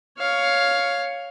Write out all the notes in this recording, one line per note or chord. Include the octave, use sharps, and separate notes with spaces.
C#5 F5